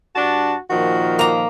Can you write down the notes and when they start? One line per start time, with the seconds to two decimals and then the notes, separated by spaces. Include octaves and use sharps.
0.16 G2 D4 F#4 A5
0.70 A#2 D#3 F3 F#4
1.19 A#3 A#5